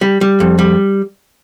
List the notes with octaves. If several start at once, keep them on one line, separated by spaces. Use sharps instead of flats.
G3
G3
F2
G3